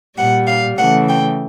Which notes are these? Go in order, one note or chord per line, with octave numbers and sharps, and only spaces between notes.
A#2 G3 F#5
F5
C#3 E3 A3 F#5
G5